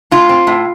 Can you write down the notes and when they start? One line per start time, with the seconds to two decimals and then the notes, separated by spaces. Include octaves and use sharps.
0.11 A2 F4
0.29 C4
0.47 A2